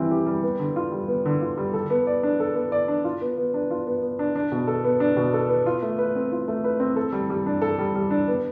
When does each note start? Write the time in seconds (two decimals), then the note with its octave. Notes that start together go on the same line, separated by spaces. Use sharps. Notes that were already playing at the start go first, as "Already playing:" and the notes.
Already playing: E3 G3 C4
0.11 G4
0.26 G3
0.43 B3
0.59 D3
0.76 F4
0.92 G3
1.08 B3
1.26 D3
1.41 F4
1.57 G3
1.74 A4
1.90 B3
2.07 D5
2.23 D4
2.40 A4
2.55 B3
2.72 D5
2.88 D4
3.04 F4
3.21 B3
3.38 B3
3.54 D4
3.70 F4
3.87 B3
4.03 B3
4.19 D4
4.36 D4
4.52 B2
4.67 A4
4.84 B3
5.00 D4
5.17 B2
5.33 A4
5.49 B3
5.66 F4
5.82 A3
5.99 B4
6.16 C4
6.32 F4
6.48 A3
6.64 B4
6.80 C4
6.96 A4
7.12 G3
7.30 G3
7.46 D4
7.62 A4
7.79 G3
7.95 G3
8.11 D4
8.28 B3